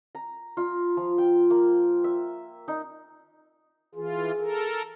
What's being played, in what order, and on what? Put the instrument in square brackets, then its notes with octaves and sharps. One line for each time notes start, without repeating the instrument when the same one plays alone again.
[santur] A#5
F4
F3
G5
A#3
E5
D#4
[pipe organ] E3 F4 [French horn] G#4
[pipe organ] A4 A#4